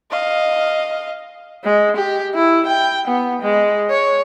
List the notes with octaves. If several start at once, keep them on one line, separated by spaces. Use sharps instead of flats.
D#5 F5
G#3
G4
E4
G5
B3
G#3
C#5